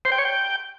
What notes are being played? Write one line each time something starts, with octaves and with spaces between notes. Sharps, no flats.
C5
G5
C#5
G5